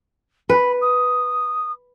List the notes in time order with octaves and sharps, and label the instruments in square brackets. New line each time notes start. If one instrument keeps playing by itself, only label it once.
[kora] B4 [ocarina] B5
[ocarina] D#6